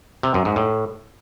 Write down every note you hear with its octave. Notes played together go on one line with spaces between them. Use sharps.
C3
F#2
G#2
A2